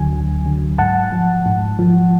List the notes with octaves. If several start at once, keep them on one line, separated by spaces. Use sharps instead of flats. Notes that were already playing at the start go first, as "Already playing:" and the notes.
Already playing: D2 D3 F#3 G#5
D2
D3 F#3
G#2 F#5 A5
F3
G#2
F3